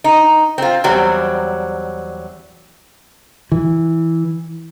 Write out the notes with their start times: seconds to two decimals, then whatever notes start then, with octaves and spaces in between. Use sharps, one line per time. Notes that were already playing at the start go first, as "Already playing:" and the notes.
0.04 D#4
0.58 C4 F4
0.84 E2 F#3 G3 C4
3.52 E3